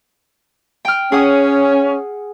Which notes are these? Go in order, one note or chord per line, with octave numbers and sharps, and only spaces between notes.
G5 F6
C#4 G#4 F#5 D#6